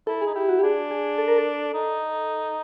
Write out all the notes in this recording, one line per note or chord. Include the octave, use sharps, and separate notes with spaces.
E4 A4
G#4
D#4
E4 G4
F#4
G4
D4 G#4
G#4
A4
A#4
A4
D#4